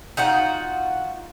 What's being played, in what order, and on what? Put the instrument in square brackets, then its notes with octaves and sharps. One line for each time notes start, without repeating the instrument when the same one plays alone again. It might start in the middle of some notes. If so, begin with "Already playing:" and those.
[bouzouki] D#4 F4 F#4 F#5